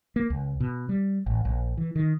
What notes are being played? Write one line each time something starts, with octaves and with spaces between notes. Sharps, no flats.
A#3
C#2
B2
G3
A1
A#1
E3
D#3